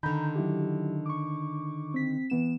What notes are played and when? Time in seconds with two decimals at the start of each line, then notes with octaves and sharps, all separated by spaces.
0.03 D3 D#3 A#5 B5 G6
0.35 F#3 E4 G4
1.06 C#6 D6
1.94 C4 B6
2.30 E3 B3 E7